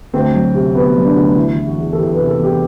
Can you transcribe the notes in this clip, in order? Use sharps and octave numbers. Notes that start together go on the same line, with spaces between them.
D2 C4
F#3
C3
D2 B3
F#3
D4
D2
E3 E4
E3
F#4
E2
A4
E3 G4
C3 B4
A4
E2 G4